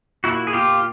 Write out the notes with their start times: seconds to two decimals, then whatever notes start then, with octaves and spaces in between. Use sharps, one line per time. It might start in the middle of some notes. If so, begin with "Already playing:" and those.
0.24 A#2 E4 F#4
0.47 G#4
0.53 A#2 F4 G4